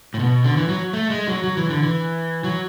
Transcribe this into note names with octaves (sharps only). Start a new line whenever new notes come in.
A2
B2
D3
E3
F#3
A3
G#3
F#3
F#3
E3
D3
E3
F#3